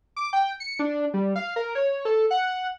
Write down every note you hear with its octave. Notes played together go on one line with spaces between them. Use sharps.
D6
G5
C#7
D4
G3
F5
A#4
C#5
A4
F#5